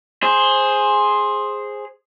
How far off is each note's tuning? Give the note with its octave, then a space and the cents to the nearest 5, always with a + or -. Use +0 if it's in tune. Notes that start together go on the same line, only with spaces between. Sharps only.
G#4 +0 C5 +10